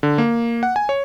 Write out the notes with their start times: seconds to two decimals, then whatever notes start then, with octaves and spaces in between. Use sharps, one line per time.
0.03 D3
0.18 A#3
0.63 F#5
0.76 G#5
0.89 C#5